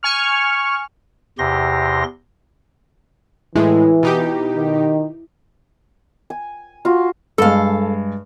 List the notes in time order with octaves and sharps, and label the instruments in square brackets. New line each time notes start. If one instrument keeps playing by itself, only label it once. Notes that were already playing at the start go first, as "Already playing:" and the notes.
[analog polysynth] G#5 C#6 F6
[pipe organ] E2 C3 G4 C6 A#6
[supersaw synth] A2 G#3 [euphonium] E3 [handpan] E4
[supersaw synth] B2 D#4 G4
[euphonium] D#3
[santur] G#5
F4 F#4
[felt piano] G2 G#3 [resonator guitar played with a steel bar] A4 F5